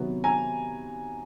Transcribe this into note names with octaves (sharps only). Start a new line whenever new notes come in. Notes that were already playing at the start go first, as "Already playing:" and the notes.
Already playing: C3 D#3 F#3 B3
G#5 A#5